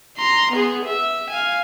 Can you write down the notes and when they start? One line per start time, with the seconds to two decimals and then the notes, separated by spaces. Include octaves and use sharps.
0.18 A#5 C6
0.51 B3 G#4
0.85 E5
1.29 F5 G#5